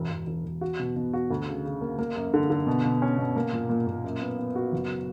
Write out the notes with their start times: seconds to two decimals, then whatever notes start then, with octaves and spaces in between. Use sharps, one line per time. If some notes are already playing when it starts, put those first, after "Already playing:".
Already playing: E1
0.11 E1
0.27 E1
0.45 E1
0.61 F#4
0.79 B2
0.96 B2
1.13 F#4
1.31 D2
1.48 C#3
1.65 C#3
1.81 A#3
1.99 A#3
2.16 F#2
2.34 D3
2.50 D3
2.67 B2
2.84 B2
3.02 C#4
3.18 B2
3.36 A#3
3.53 A#2
3.69 A#2
3.87 A#2
4.04 F#2
4.21 B3
4.39 B3
4.56 F#4
4.72 F#1